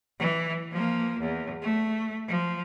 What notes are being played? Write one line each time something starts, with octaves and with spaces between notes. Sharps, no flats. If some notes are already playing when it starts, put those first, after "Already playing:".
E3
F3 A#3
E2
A3
F3